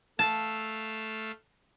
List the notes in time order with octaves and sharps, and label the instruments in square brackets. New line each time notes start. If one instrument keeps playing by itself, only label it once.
[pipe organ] A3 F5 E6 [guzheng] A5